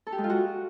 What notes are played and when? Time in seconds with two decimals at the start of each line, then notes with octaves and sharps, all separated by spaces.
0.07 A4
0.12 G4
0.18 G#3
0.24 F4
0.30 F#4